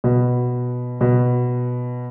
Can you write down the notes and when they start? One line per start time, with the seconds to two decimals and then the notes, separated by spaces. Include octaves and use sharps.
0.04 B2
1.01 B2